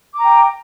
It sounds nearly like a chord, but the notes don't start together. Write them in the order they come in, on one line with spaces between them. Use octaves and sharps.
D6 A#5 G5